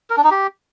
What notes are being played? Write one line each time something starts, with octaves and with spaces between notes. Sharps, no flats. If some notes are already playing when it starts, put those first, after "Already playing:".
A#4
D4
D#4
G4